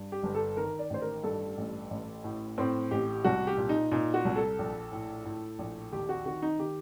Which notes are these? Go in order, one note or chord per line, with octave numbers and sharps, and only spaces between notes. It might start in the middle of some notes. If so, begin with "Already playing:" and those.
Already playing: G2
G4
G1
A4
D#3 A#4
D5
A1 C5
A#4
G2 A4
A1
A1
A2
A2 C4
A1 G4
C2 F#4
G4
A#2
D#4
A#2 D#4
F#4
C2
A4
A#1
A2
A2
A#1
D#2 G4
F#4
D#3 F#4
D#4
D#3 G4